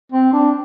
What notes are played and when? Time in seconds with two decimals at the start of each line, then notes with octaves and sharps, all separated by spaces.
0.12 C4
0.33 D4